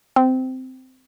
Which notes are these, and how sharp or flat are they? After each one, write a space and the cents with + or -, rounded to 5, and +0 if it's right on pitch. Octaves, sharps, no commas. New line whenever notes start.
C4 -15